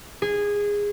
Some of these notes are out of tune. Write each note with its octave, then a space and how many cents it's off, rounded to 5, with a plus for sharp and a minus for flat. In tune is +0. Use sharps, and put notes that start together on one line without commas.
G#4 -15